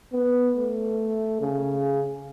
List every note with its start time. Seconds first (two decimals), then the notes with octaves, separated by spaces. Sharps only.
0.13 B3
0.56 A3
1.41 C#3